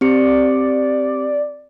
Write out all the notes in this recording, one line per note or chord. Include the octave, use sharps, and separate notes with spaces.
C4 G4 D5 C#7